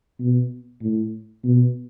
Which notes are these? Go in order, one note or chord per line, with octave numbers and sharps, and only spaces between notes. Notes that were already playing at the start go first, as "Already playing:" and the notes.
B2
A2
B2